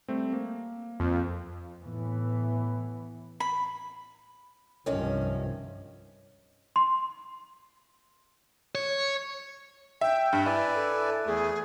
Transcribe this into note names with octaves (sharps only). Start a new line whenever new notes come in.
G3 A3 C4
A#3
F2
A2 E3 B3
B5
C2 G2 C3 D#3 F3 C#4
C6
C#5
E5 G5
G2 E5
E4 B4 D5 G#5
A4
E2 A3 G#4